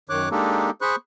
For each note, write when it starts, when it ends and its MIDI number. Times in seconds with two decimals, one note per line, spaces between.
0.09 0.29 42
0.09 0.29 51
0.09 0.29 73
0.09 0.29 86
0.09 0.29 90
0.31 0.70 56
0.31 0.70 58
0.31 0.70 62
0.31 0.70 63
0.31 0.70 67
0.31 0.70 69
0.81 0.96 68
0.81 0.96 72
0.81 0.96 83
0.81 0.96 85
0.81 0.96 90